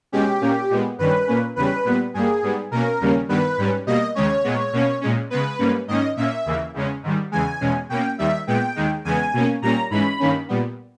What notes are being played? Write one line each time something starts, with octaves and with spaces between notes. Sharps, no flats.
B2 G#3 C#4 G4
A#2 A#3 C#4
A#2 G#3 B3
G2 D#3 G3 C#4 B4
A#2 A#3 C#4
E2 C#3 G3 C#4 B4
A#2 G3 B3
G2 G3 A#3 G#4
G#2 G3 B3
B2 A#3 C#4 A#4
D#2 C#3 G3 A#3 C#4
G2 D#3 G3 B3 B4
G#2 G3 C#4
B2 G3 A#3 D#5
D#2 C#3 G#3 C#4 C#5
A#2 G#3 B3
B2 A#3 C#4
A#2 G#3 C#4
C#3 G#3 B3 B4
G#2 G3 A#3 C#4
G#2 D#3 A#3 C#4 D#5
A#2 A#3 C#4 E5
D#2 C#3 E3 A#3
E2 C#3 G#3 C#4
G#2 D#3 G3
E2 C#3 E3 G#3 G#5
E2 B2 G#3 C#4
B2 A#3 C#4 G5
D#2 D#3 G3 E5
A#2 G#3 B3 G5
D#2 D#3 G#3
E2 C#3 G#3 B3 G#5
B2 A#3 C#4
A#2 G3 A#3 C#4 A#5
G#2 E3 G#3 C#4 B5
G2 D#3 A#3 C#4
A#2 G3 B3